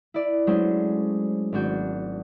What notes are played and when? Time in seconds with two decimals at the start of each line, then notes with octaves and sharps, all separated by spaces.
0.14 E4 D5
0.47 F#3 G#3 A3 C#4 D4 C5
1.52 G#1 C4 D4 F#4 G6